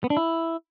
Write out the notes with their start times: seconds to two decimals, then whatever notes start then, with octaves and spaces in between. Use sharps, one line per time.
0.04 B3
0.10 D4
0.17 E4